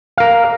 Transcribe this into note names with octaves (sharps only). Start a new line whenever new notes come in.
A#4 F5 A#5